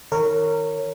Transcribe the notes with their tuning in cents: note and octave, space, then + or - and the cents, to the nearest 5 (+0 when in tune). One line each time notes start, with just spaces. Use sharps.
D#3 +0 A#4 -20 C#5 +0